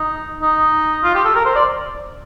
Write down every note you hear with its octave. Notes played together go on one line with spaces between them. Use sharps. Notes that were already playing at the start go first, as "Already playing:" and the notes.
Already playing: D#4
D#4
F4
G4
A4
A#4
C5
D5